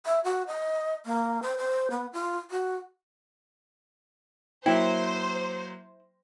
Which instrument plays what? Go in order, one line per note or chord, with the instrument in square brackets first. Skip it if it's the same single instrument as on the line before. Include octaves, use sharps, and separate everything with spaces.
[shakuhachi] E5
F#4
D#5
A#3
C5
C5
B3
F4
F#4
[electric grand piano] F#3 A#3 [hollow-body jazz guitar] E4 [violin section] C5 [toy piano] G5